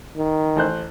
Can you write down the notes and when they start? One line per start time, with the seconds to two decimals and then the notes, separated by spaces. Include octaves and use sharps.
0.17 D#3
0.56 A1 C5 F#6